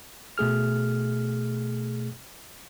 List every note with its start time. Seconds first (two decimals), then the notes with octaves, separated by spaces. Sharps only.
0.38 B2 A3 G#4 F6